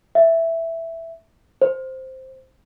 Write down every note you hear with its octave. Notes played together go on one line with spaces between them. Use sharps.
E5
C5